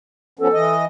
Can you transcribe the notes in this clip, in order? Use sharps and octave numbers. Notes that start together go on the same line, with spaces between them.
F3 B3 C#4 A4
E3 D#5